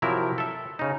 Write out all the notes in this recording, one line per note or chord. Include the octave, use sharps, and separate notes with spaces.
C3 F3 F#3 E4 A#4
A4 E5
C#3 D#4